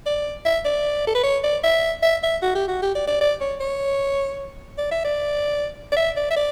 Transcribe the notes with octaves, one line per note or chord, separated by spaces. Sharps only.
D5
E5
D5
A4
B4
C#5
D5
E5
E5
E5
F#4
G4
F#4
G4
D5
D5
D5
C#5
C#5
D5
E5
D5
D5
E5
D5
E5
D5